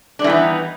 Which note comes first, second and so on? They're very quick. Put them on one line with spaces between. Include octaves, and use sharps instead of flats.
D4 G3 E3 B3 D#4